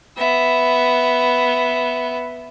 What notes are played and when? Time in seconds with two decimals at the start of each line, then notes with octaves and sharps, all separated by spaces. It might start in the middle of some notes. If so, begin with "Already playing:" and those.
0.17 B3 E5